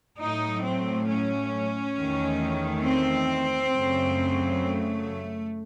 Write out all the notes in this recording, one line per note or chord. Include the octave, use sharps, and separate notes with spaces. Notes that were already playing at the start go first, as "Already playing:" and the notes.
A2 F#3 A3 D#4
C4
C#4
E2 D#3 A3
C4
F#2 C#3 F#3 A3
A3